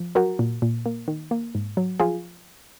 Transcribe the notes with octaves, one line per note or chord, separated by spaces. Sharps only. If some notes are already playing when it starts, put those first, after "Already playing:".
Already playing: F3
F#3 F#4 A#4
A#2
A#2
A#3
D#3
A#3
G#2
F#3
F3 F4 G#4